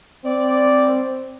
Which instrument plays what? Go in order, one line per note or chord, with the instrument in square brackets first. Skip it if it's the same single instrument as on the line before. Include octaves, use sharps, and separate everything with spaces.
[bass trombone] C4 [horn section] D5